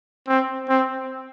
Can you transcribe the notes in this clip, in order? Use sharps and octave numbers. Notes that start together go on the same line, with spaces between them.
C4
C4